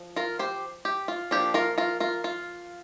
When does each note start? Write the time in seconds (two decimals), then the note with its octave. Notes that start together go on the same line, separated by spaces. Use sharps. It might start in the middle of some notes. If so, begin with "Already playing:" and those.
Already playing: F3
0.16 F4 A#4
0.39 G4 C5
0.85 G4
1.08 F4
1.31 F3 A#3 D4 G4
1.54 F4 A#4
1.78 F4 A#4
2.00 F4 A#4
2.24 F4